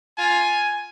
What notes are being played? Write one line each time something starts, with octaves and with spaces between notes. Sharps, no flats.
F4 G#5